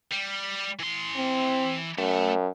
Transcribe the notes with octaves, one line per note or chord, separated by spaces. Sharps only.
G3
E3 C6
C4
F#2 A3